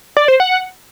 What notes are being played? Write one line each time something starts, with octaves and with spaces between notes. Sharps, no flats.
D5
C5
F#5